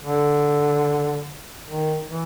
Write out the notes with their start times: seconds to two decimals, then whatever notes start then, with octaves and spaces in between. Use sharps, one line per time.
0.03 D3
1.67 D#3
2.07 E3